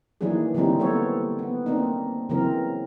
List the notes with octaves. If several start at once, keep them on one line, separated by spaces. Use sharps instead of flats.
D#3 E3 F#3 A#3 D4 G#4
D3 E3 F#3 G3 C4 D#4
F#3 A#3 B3 A4 C5 C#5
B3
A#3 C4 D4 D#4
C#3 E3 F#3 C4 A#4